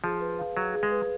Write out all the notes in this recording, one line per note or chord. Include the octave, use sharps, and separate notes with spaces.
F3 G#4
B4
F5
F#3 G#4
G#4
G#3
B4